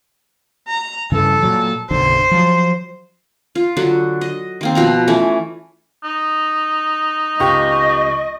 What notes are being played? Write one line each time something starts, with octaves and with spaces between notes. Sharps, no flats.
A#5
G2 C#3 E3 A4
A#2 F#3
F#1 B1 D3 C5
F3 F#3
F4
D3 F#3 F#4
D#5
D#3 A#3 C4
B2 F3 A#5
E3 A3 C#4
D#4
C#2 G4 D#5 C#6